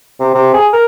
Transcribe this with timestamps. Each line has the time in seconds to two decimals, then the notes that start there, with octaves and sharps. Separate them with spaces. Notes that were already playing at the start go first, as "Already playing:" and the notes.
0.20 C3
0.34 C3
0.53 G#4
0.73 A#4